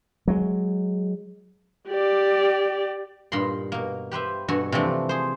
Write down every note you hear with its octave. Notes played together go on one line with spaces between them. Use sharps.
F#3 G#3
G4 D5
G2 A#2 D#4 B5 C6
B2 A#3
G4 B4 C5 E5
G2 B2 F#4 A4 G#5
C3 E3 F3 A3 D4
G#4 C5